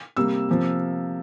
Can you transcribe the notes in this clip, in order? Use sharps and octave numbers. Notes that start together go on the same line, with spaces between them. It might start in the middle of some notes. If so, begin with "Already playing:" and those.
C3 G3 A#3 E6
C3 F3 A#3